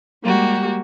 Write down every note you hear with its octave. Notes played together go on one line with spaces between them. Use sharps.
G3 G#3 A#3 F#4 G4